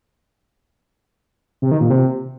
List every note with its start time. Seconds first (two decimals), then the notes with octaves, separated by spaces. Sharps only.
1.62 C3
1.71 D#3
1.81 A#2
1.90 C3